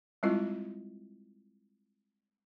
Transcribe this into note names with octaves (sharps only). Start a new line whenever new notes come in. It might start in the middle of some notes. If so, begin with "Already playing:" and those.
G3 G#3 C4 E4 F4 D#5